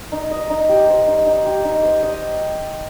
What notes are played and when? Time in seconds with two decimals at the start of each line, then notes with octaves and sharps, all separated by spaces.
0.12 D#4
0.31 D#5
0.50 D#4
0.69 G4
0.88 C5
1.07 D#4
1.26 D#4
1.45 G4
1.64 D#4
1.83 C5
2.03 D#5